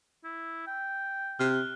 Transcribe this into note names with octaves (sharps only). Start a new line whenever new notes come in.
E4
G5
C3 F6 F#6